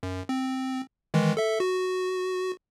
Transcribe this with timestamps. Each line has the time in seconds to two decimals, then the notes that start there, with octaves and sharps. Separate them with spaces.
0.03 F#2
0.29 C4
1.14 D#3 E3 G#3
1.37 A4 E5
1.60 F#4